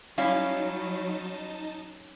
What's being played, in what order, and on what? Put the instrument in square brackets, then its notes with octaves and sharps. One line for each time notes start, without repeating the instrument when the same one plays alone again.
[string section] F#3 [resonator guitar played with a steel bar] G3 E4 F5 [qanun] C#4 [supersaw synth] D#4 A5